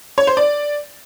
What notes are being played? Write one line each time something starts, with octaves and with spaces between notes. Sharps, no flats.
C#5
C5
D5